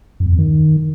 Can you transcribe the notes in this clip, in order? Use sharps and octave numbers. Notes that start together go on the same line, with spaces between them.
F#2
E2
F2
D#3